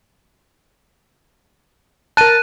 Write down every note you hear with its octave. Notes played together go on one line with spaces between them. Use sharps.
A#4 A5 F#6 D#7